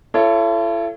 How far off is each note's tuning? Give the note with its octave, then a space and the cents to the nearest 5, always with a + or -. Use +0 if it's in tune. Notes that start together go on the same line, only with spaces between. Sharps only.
E4 +45 A4 +0 C#5 +0